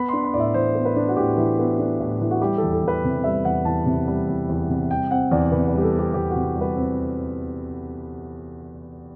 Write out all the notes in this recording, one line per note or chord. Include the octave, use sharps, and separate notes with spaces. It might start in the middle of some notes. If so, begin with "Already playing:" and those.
Already playing: B3 B5
D4 C6
B5
A2 D5
E5
E3 C5
B3
B4
D4
F#4
A2 G4
E3
B3
D4
A2
E3
F#4
G3 G4
A4
E2
A4
E2 B4
C3
G3 E5
E2 F#5
E2 A5
C3
G3
E2
E2
C3
G3 G5
C4 F#5
E2 D5
C3 B4
B4
G3 G4
A4
C4
G4
E2 G4
C3 F#4
G3 B4
C4